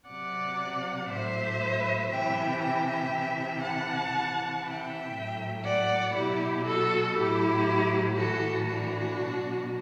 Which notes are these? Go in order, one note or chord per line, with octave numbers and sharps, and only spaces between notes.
C3 F#3 D5 F#5
A2 F#3 C5 E5
C3 E3 E5 G5
E5 G5
C3 E3
F#5 A5
C3 E3
E5 G5
A2 F#3
D5 F#5
B2 F#3 E4 G4
F#4 A4
A2 F#3 E4 G4
A2 E3 F#4 A4
D4 F#4
B2 F#3